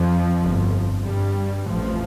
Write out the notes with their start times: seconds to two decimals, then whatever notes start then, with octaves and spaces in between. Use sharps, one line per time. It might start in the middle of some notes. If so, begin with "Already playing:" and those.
Already playing: F2 F3
0.43 G1 G2
1.06 G2 G3
1.67 A1 F2 A2 F3